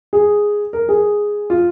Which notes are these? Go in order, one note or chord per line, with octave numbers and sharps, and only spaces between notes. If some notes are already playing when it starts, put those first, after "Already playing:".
G#4
A#4
G#4
F4